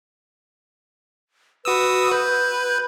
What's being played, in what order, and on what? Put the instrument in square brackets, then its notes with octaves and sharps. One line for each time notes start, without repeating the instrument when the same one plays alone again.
[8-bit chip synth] F#4 D#6 E6 [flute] B4
[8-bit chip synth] B4 [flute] G6